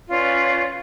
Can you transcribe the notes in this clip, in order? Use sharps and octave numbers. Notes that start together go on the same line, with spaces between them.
C#4 F4 B4 D5